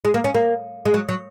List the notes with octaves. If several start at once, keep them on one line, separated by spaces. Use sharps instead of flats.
G#3
A#3
C#4
A#3
G#3
F#3
F#3